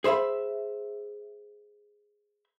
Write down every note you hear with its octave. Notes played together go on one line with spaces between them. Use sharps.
G#4 C5 E5 B5